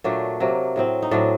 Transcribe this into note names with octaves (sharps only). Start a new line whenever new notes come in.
A#2 F#3 A3 D4
C3 F#3 A#3
A2 F#3 C4
D#4
A2 F#3 C4 D4